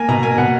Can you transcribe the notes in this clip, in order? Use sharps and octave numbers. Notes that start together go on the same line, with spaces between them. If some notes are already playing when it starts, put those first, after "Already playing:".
Already playing: A#3 G#5
B2 A#5
A#3 G#5
B2 F#5